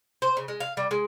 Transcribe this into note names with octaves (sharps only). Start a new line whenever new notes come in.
C5
C#3
G#3
F5
G3
G#3